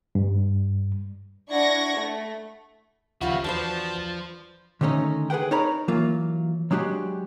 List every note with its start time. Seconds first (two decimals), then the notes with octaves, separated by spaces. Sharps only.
0.15 G2
1.50 D4 E4 F#5 C#6 G#6 A#6
1.98 A3
3.21 D#2 C#3 F3 G3 B3 F4 F#4 E5
3.44 E2 F3 D4 F#4 B4 C5 A5
4.81 D3 D#3 A3 C#4 D#4
5.30 G#4 B4 C5 F#5 G5
5.51 D#4 A#4 C#5 D5 A#5 B5
5.88 E3 F#3 A#3 F4
6.71 F#3 G#3 D4 F#4 G4